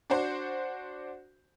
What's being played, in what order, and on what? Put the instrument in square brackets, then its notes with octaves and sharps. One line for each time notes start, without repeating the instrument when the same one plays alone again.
[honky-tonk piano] D4 F#4 C5